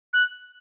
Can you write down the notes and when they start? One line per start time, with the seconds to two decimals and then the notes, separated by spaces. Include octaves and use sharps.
0.13 F#6